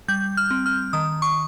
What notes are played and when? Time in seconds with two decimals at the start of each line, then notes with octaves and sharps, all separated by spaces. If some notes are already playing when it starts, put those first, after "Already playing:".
0.08 G3 G6
0.37 F6
0.51 C4
0.66 F6
0.93 D#3 D#6
1.22 C#6